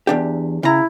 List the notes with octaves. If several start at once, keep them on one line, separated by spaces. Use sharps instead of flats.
E2 D4 G4
C#3 E4 A#5